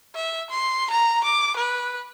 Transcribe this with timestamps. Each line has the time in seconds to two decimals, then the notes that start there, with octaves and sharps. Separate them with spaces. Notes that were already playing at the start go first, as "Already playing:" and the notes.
0.15 E5
0.50 C6
0.91 A#5
1.24 D6
1.57 B4